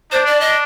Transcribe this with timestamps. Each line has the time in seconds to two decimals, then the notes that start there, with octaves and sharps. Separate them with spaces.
0.11 D4 C5
0.26 D5
0.41 D#5